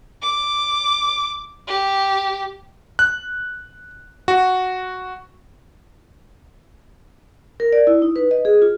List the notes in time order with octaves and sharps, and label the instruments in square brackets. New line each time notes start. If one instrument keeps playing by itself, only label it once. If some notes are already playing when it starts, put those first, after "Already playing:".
[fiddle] D6
G4
[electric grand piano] F#6
F#4
[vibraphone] A#4
D5
E4
D#4
B4
D#5
G#4
F4